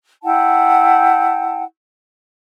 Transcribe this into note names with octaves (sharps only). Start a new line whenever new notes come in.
E4 F#5 G5 A5